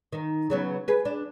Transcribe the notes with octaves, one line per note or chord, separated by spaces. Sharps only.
D#3 D#4
C#3 F#3 B3
G#4 B4
D4